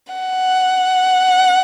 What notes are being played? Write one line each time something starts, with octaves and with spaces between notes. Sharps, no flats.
F#5